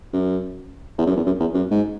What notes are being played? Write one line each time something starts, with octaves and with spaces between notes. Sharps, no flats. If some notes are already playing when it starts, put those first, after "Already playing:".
F#2
E2
F#2
E2
F#2
E2
F#2
G#2